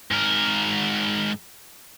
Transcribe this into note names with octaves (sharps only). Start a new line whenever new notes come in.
G#2 A#4